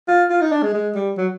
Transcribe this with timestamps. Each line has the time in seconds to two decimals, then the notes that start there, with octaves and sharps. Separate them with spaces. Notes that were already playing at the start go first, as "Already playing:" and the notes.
0.08 F4
0.30 F4
0.41 D#4
0.52 D4
0.62 G#3
0.74 G#3
0.95 G3
1.17 F#3